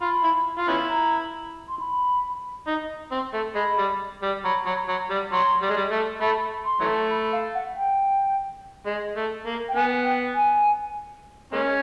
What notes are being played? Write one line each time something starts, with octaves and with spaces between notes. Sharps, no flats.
F4 B5
E4
F4
B3 C#4 E4
A#5
C6
B5
D#4
C4
A3
G#3 B5
G3
G3
F#3 B5
F#3
F#3
G3
F#3 C6
G3
G#3
G3
A3
A3 B5
C6
E3 F#3 A3
B5
F5
F#5
G5
G#3
A3
A#3
G5
B3 G#5
G5
G#5
G#3 A#3 C#4